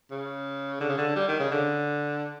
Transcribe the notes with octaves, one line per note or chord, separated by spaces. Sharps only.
C#3
D3
C#3
D3
G3
D#3
C#3
D3